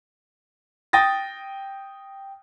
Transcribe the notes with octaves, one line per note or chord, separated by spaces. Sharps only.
G5 D#6 A6 A#6